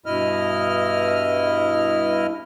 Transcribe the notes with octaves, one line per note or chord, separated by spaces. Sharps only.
G2 B2 E4 D#5 F6